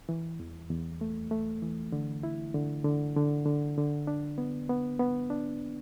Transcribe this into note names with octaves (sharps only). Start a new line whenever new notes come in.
E3
E2
E2
A3
A3
E3
D3
E4
D3
D3
D3
D3
D3
D4
B3
B3
B3
D4